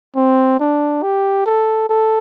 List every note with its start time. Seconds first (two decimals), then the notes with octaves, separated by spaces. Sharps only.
0.16 C4
0.59 D4
1.03 G4
1.46 A4
1.89 A4